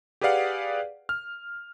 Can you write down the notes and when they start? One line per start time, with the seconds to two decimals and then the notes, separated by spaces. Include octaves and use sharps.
0.21 G4 G#4 B4 D5 F5 F#5
1.09 F6